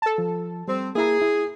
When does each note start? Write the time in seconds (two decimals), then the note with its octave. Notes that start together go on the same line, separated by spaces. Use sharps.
0.02 A4 A5
0.18 F3
0.68 G3 C4
0.95 A#3 E4 G#4 A#5
1.22 E4